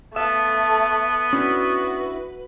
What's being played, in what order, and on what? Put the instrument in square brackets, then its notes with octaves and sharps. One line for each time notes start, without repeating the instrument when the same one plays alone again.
[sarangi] A3 [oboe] B3 [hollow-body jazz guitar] E5 F5 [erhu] A5
[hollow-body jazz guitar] C#4 D4 E4 [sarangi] F#4 [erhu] B4